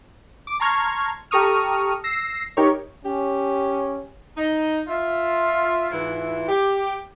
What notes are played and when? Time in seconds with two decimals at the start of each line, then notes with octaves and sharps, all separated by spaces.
0.47 D6
0.60 A5 A#5 C6 C#6 F6 G#6
1.31 G4 A4 A#5 C#6 D#6 F6
2.04 E6 A#6 C7
2.57 D#4 G4 A#4 C#5
3.05 C#4 G4
4.37 D#4
4.87 F4 E5
5.91 G#2 E3 E4 F4
6.47 G4